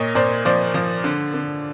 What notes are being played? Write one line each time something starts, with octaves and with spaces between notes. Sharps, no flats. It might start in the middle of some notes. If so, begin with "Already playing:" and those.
Already playing: A#2 C#5 D#5
A#2 C5 D5
F3 C5 D5
F3
D3
D3